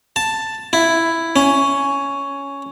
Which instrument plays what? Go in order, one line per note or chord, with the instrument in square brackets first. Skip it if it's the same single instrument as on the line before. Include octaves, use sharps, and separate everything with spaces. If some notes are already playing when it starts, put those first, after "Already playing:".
[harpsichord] A5
E4
C#4